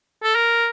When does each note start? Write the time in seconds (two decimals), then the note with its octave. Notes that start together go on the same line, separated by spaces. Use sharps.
0.23 A4
0.35 A#4